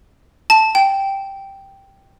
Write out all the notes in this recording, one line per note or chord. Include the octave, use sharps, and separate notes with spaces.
A5
G5